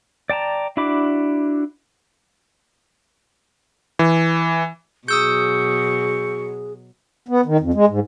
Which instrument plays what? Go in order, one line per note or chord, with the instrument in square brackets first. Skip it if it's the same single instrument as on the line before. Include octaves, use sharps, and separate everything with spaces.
[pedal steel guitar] D5 G5 A5 A#5
D4 E4 F#4 B5 D6
[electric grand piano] E3
[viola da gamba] B2 F#3 [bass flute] G#4 [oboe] C#6 [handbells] D#6 E6 G6
[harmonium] B3
D#3
F2
G#3
G#2